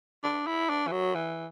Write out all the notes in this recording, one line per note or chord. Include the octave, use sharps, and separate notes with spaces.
D4
E4
D4
E3
F#3
E3